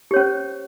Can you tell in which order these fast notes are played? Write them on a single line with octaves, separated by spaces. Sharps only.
G4 C#5 C#4 C5